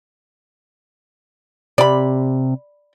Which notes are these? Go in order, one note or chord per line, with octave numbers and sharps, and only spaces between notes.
C3 D5 B5